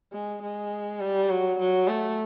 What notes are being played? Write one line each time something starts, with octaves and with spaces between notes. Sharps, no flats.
G#3
G#3
G3
F#3
F#3
A3